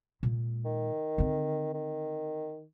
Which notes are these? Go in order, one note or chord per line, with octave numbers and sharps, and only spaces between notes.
A#2 G#3
D#3
D3 C4
D#3